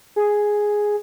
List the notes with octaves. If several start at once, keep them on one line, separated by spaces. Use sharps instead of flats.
G#4